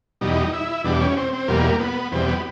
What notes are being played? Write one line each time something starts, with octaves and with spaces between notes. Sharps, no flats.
E2 B2 G3 D#4
E4
E2 B2 G3 D4
C#4
C4
C4
E2 B2 G3 A#3
B3
E2 B2 G3 C4
B3